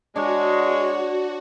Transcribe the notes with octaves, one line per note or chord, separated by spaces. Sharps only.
G#3 D4 F#4 C#5